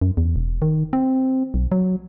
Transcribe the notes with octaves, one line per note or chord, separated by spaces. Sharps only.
F#2
E2
E1
D#3
C4
B1
F#3